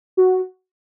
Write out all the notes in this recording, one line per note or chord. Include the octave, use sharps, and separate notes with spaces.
F#4